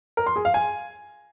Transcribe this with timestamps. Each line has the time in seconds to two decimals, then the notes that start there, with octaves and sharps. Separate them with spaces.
0.17 A#4
0.26 C6
0.36 G#4
0.45 F5
0.54 G#5